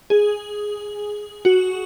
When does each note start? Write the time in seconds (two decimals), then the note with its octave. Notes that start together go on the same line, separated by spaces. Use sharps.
0.10 G#4
1.45 F#4